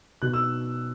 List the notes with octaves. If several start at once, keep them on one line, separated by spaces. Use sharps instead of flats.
B2 F#6
E6